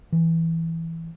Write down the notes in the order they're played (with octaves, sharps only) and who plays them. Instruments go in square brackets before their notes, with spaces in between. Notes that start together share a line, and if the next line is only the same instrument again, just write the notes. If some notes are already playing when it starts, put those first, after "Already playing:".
[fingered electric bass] E3